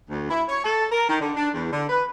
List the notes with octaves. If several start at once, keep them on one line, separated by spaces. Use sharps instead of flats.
D2
E4
C#5
A4
A#4
D#3
D3
D4
E2
D3
B4